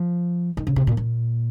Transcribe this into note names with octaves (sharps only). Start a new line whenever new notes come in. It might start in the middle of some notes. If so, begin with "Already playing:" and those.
Already playing: F3
D#3
C#3
C3
A#2
A#2